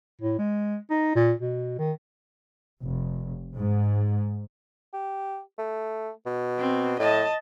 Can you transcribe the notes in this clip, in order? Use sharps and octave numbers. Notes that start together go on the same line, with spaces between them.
A2
G#3
D#4
A#2
B2
D#3
F1
G#2
G4
A3
B2
C4
A2 D#5 A5